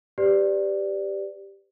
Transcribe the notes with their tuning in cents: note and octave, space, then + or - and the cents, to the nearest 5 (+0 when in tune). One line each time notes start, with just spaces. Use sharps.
G4 +0 B4 +40 D5 +0